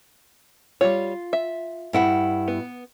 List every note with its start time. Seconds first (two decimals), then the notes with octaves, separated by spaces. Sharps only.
0.81 G3 F4 C#5
1.33 E5
1.93 G2 E4 F#5
2.48 B3